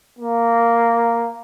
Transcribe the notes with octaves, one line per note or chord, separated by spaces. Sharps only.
A#3